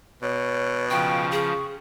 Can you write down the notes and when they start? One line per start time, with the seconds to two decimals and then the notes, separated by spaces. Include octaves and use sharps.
0.22 B2 C#5
0.90 C#3 F3 G5 C#6
1.31 G#4